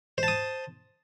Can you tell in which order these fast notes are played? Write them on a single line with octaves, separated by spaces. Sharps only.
C5 A5 D#6